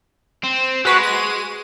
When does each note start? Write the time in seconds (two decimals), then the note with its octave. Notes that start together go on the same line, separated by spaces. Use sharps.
0.44 C4
0.85 G#3 F#4 B4
1.03 D#7